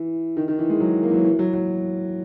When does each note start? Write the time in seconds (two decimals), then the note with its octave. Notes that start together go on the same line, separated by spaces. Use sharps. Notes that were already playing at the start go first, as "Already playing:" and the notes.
Already playing: E3
0.37 D#3
0.48 D#3
0.59 E3
0.70 G#3
0.80 F#3
1.03 A#3
1.10 E3
1.14 F#3
1.24 E3
1.39 F#3
1.54 F#3